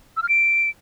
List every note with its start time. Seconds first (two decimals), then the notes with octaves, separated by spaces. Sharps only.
0.17 E6
0.23 F6
0.29 D7